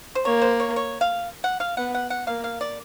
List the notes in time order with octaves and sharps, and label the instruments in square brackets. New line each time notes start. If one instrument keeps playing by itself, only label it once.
[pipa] C5
[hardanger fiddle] A#3 [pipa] C#5
[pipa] C5
C#5
C#5
F5
F#5
F5
[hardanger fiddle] B3 [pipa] F#5
[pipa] F#5
F#5
[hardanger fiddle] A#3 [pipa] F5
[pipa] F5
D5